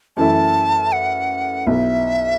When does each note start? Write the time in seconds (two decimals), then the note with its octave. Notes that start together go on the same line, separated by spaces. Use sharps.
0.17 F#2 E3 A3 E4 A5
0.92 F#5
1.67 B1 B2 B3 E4 E5